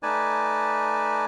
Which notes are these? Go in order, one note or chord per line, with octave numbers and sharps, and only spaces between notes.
A3 D#4 B4 D5 G#5 A5